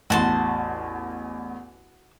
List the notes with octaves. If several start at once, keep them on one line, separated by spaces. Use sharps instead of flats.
A1 E2 F#4 A5 C6